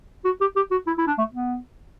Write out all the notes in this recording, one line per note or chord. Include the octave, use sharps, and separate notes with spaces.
F#4
G4
G4
F#4
E4
E4
D4
A3
B3